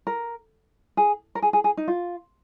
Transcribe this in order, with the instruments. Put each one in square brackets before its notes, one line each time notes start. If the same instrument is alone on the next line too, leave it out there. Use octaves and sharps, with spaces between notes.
[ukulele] A#4
G#4
A#4
G#4
G#4
G#4
D#4
F4